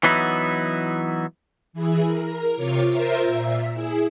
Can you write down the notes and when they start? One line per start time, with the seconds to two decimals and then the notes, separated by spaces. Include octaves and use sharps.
0.03 E3 F#3 B3 D#4 E4
1.73 E3 E4 G#4
2.07 A#4
2.56 C3 F4 C#5 D6
2.90 F4 A#4 C5 E5 A#5
3.24 A#2 E5
3.74 E4 G#4